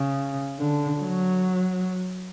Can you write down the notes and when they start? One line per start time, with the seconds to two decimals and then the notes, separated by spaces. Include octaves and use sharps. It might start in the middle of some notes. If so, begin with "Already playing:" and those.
Already playing: C#3
0.60 D3
1.00 F#3